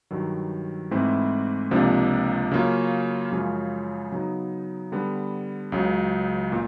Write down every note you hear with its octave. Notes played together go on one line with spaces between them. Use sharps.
G2 D#3 F#3
G#2 E3 A3 C4 E4
C#2 C3 F3 A#3 D4
C#3 F#3 A#3 C#4 F4
F#2 C#3 F3 G#3 C#4
C#3 F#3 B3 D#4
D3 G3 B3
C#2 C#3 F#3
A#2